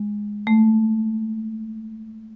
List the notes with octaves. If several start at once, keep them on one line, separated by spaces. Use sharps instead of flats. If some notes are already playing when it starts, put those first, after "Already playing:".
Already playing: G#3
A3